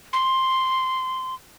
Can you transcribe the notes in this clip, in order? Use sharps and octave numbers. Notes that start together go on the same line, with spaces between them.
C6